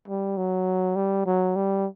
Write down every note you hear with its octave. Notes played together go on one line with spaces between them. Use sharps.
G3
F#3
G3
F#3
G3